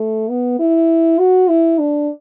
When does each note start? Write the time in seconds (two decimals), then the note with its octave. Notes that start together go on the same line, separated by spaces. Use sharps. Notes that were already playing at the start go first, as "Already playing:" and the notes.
Already playing: A3
0.30 B3
0.59 E4
1.19 F#4
1.49 E4
1.79 D4